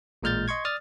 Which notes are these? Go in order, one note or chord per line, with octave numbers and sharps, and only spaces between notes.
A1 A#2 G#3 F6 G6 A6
D#5 C6 C#6 G#6
D5 D#6 F6 A6